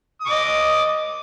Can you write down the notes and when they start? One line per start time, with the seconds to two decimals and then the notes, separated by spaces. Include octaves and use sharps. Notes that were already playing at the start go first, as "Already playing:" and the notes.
0.21 D#6
0.26 D6
0.31 D#5